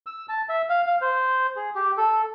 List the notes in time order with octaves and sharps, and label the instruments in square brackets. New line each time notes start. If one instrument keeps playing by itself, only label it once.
[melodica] E6
A5
E5
F5
F5
C5
G#4
G4
A4